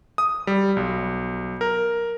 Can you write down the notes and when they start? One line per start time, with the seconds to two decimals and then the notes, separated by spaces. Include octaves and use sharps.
0.18 D#6
0.47 G3
0.77 B1
1.61 A#4